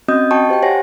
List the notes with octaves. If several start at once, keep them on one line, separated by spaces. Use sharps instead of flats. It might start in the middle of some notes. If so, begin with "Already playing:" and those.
C4 C#4 F#4 D#5 D#6 G6
F#4 D#5 G5 A5 C#6
G4 C5 F5 G5
G4 C5 C#5 F#5 G#5 A#6